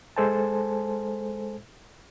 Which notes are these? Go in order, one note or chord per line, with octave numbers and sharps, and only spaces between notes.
G#3 A4 C5 G#5 A5